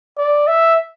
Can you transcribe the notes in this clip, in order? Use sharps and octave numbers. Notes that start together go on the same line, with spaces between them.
D5
E5